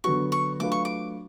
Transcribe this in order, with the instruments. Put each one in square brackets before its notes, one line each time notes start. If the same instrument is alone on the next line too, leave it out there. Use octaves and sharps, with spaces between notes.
[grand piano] D3 F#3 B3 F#4 [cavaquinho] C#6
[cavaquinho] C#6
[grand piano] F#3 A3 D4 F4 B4 [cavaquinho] D6
[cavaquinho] C#6
D6